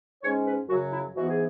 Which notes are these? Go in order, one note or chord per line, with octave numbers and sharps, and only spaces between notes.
G#2 G#3 C#4 C#5
B4
F#2 C#3 F#3 F#4
E4
G#2 E3 B3 F#4
G#4